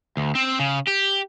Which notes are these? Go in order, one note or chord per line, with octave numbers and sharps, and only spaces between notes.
D2
C4
C#3
G4